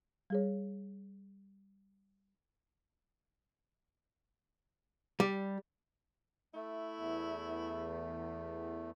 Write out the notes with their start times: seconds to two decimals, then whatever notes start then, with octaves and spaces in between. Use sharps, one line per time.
0.30 G3 G#4 C#5
5.20 G3
6.54 A3 E4
6.98 E2